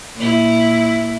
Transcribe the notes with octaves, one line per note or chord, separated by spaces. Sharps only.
A#2 A#3 E4